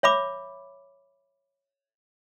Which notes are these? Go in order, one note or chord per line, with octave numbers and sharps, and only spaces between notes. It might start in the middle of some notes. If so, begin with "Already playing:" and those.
C#5 E5 B5 D6